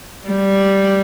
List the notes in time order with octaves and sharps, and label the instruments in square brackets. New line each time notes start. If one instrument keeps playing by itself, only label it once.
[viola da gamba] G3